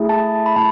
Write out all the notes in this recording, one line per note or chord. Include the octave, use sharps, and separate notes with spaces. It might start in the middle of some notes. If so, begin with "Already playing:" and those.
Already playing: A3 E4 G#4
A5
B5
A3 A5